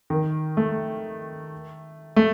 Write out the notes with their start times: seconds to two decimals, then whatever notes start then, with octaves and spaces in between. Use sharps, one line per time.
0.10 D#3
0.57 A3
2.16 A3